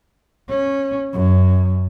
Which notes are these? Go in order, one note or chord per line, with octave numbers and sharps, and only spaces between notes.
C#4
F#2